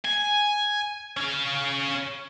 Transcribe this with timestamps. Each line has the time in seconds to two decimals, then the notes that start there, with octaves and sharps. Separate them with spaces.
0.05 G#5
1.17 C#4 F5